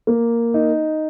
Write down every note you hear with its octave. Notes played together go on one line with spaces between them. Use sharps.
A#3
D#4